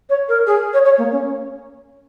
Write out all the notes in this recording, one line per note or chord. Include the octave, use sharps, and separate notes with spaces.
C#5
A#4
G#4
C#5
C#5
A#3
C#4